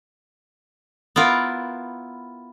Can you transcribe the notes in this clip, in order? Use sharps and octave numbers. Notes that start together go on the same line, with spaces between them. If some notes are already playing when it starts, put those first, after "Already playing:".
B3 E4 F4 A#4